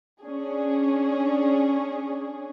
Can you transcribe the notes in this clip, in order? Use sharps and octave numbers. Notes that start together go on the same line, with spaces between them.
C#4 D4 G#4